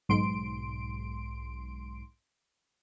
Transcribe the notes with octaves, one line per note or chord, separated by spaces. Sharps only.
B1 G#2 C6 D7